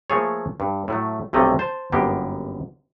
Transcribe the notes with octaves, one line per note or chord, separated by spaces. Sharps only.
F3 A3 A#3 G#4 A4 C#5
G2
A2 F#3 A3
B1 G2 C3 G3 A3 D#5
C5 A5
G1 F#2 A#3 B3 G4